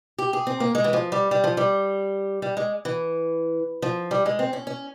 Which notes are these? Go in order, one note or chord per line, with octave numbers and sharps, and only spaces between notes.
G4
G#4
C4
A#3
G#3
E3
F3
G3
G3
F3
G3
G3
G#3
E3
F3
G3
G#3
C4
C#4
C#4